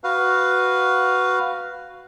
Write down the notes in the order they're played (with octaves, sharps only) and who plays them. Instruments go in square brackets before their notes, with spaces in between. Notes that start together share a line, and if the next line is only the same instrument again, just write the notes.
[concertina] F#4 B4 F5